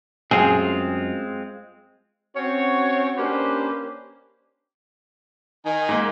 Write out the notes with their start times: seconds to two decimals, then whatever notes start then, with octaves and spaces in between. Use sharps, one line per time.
0.31 F#2 G#3 C4 F4 G#4
2.35 C4 C#4 F#4 C#5
3.18 A#3 C#4 D4 G4 B4 C5
5.66 D#3 D#4 G#5
5.89 G#2 A#3